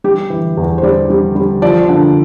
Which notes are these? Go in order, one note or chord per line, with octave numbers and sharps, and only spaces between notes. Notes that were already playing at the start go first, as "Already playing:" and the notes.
G3 G4
E3
E2
C5
G3 D5
G3
G3
F3 D5
D3